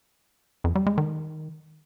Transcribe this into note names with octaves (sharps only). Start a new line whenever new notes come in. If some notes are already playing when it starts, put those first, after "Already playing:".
F2
G3
G#3
D#3